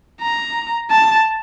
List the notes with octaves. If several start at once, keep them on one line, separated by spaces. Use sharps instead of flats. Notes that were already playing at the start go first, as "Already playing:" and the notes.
A#5
A5